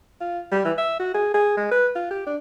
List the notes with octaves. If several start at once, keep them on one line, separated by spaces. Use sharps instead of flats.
F4
G3
E3
E5
F#4
G#4
G#4
G#3
B4
F4
G4
D4